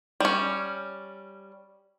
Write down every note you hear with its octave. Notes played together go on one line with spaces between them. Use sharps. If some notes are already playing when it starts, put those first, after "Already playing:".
G3 C#4